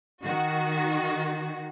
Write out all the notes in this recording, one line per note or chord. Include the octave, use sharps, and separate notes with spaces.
D#3 F#4